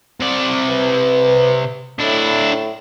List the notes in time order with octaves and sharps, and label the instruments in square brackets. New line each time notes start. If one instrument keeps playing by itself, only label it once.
[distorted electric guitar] C3 D5
[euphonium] B4
[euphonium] A2 [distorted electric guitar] D4 E4